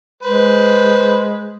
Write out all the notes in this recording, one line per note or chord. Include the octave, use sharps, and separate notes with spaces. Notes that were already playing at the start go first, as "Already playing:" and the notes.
G#3 B4 C5